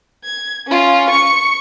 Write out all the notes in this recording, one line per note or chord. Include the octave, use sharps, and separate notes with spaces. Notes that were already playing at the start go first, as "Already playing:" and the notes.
G#6
C#4 F4
C#6 C#7